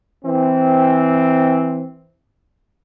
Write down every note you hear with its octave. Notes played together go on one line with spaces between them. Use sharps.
E3 C4